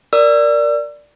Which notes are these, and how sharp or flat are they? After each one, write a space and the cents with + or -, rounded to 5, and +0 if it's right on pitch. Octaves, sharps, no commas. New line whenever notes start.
A#4 +0 D5 +0 E6 +40